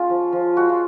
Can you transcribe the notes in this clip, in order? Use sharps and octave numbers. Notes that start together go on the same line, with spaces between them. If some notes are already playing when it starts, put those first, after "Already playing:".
Already playing: G#3 C#4 F4
F3
F3
G#3 F#4
F4